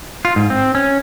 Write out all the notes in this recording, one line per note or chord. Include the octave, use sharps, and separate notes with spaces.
F4
G#2
C4
C#4